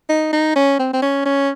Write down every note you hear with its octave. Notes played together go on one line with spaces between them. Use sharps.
D#4
D#4
C#4
C4
C4
C#4
C#4